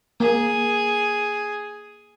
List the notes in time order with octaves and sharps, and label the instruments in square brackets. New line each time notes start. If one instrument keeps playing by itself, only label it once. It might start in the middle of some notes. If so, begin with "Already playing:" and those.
[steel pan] A#3 [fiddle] G#4